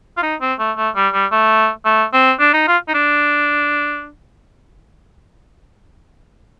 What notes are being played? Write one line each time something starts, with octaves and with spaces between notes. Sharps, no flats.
F4
D#4
C4
A3
A3
G3
G3
A3
A3
C4
D4
D#4
F4
D#4
D4